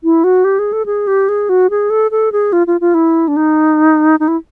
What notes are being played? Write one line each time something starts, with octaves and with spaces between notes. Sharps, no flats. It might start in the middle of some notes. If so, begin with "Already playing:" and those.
E4
F#4
G4
G#4
A4
G#4
G4
G#4
F#4
G#4
A4
A4
G#4
F4
F4
F4
E4
D4
D#4
D#4
E4